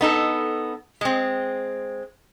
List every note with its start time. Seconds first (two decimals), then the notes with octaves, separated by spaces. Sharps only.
0.01 B3 D#4 A4
1.01 G#3 C4